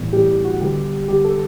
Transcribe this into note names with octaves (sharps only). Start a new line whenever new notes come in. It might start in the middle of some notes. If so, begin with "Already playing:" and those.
Already playing: A2 E3 G3 B3
A2 E3 G3 B3 G4
G4
F#4
D3 G3 B3 G4
D3 G3 B3 G4
A4